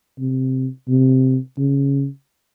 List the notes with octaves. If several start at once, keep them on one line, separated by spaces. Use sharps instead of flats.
C3
C3
C#3